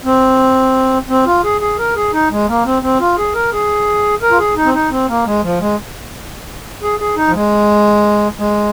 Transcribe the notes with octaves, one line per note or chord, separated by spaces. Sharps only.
C4
C4
F4
G#4
G#4
A#4
G#4
D#4
G#3
A#3
C4
C4
F4
G#4
A#4
G#4
A#4
F4
G#4
D#4
C4
D#4
C4
A#3
G#3
F3
G#3
G#4
G#4
D#4
F3
G#3
G#3